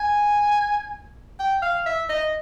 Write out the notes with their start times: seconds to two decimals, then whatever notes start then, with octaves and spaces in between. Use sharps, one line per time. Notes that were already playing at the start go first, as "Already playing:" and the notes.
Already playing: G#5
1.40 G5
1.62 F5
1.86 E5
2.09 D#5